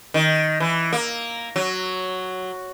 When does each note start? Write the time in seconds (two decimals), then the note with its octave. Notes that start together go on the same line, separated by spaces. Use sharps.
0.14 D#3
0.60 E3
0.93 A#3
1.56 F#3